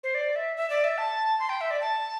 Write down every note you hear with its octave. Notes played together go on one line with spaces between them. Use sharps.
C5
D5
E5
E5
D5
E5
A5
C6
G5
E5
D5
A5